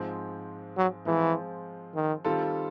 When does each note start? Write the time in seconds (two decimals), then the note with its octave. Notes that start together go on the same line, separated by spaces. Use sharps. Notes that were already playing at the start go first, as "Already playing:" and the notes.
Already playing: G#2 F3 G#3 C4
0.78 F#3
1.06 E3 F3 G#3 C4 F4
1.95 D#3
2.25 D#3 G3 C4 F4 A4